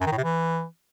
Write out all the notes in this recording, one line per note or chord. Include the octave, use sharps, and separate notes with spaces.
F#2
D#3
A2
C3
E3